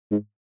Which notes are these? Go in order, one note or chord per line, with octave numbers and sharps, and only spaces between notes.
G#2